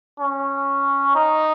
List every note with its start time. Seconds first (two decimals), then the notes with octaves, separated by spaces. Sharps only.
0.19 C#4
1.15 D#4